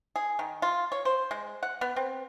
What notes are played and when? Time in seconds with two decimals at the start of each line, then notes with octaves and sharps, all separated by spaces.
0.16 G#4
0.39 D#3
0.62 F4
0.92 C#5
1.05 C5
1.31 G#3
1.63 F#5
1.81 B3
1.96 C4